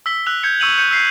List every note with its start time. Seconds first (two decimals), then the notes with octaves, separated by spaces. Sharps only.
0.06 E6 B6 G7
0.26 E6 F#6 F7
0.43 G6 G#6 C#7
0.60 C#6 E6 C#7 D#7 F7 F#7
0.78 G6 C#7 D#7
0.91 E6 B6 C7 D#7